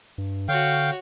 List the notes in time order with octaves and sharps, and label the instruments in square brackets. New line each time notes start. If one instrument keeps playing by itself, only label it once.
[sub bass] G2
[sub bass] D3 [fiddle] F#4 C#5 [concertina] F5 G5